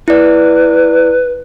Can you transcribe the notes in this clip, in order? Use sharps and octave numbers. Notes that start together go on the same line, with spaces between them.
E4 B4 D5